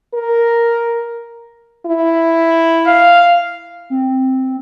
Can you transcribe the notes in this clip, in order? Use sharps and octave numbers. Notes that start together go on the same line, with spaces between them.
A#4
E4
F5
C4